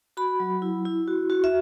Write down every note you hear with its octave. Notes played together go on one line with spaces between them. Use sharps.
F#4 B5
F#3
E4
E4
F#4
F#4
E5